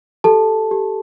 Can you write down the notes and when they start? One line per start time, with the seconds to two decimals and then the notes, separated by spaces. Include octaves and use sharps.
0.24 G4 A4 A5
0.71 G4